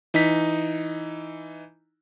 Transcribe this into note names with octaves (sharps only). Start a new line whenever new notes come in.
E3 D#4 A#5 B6